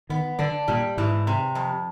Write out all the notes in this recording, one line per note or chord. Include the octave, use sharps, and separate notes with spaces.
D#3 B3
D3 D4
A#2 G3
G#2 E3
C3
F2